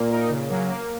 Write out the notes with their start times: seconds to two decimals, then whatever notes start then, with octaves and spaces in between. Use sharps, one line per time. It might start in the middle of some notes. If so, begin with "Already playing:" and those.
Already playing: A#2 A#3
0.10 D#4 A#4
0.30 C#3
0.49 F#3 A#3
0.69 A#3